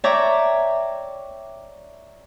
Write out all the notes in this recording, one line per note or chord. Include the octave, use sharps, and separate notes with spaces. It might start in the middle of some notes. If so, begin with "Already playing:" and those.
C#5 D5 E5 G5 A#5